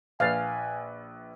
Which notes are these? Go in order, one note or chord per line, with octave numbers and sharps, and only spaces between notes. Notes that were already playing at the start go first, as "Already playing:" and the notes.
A#1 B4 F5 G#5 A6